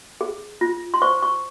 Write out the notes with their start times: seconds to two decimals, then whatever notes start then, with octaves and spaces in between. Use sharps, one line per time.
0.21 G#4
0.61 F4
0.94 C6
1.02 C5 C#6
1.22 C#6